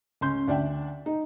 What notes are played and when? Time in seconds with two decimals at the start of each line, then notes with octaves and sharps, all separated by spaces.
0.21 C#2 C#4 C6 G6
0.48 D2 D4 D5 E5 G5
1.06 D#4